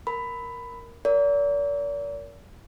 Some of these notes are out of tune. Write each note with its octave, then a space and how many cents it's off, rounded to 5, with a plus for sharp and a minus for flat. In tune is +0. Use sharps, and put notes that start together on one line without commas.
A#4 +0 B5 +15
A#4 +0 D5 -40